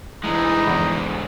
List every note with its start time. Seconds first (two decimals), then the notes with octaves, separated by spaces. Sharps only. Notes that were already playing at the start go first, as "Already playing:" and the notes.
0.24 D2 E3 G#3 D#4 E4
0.67 E2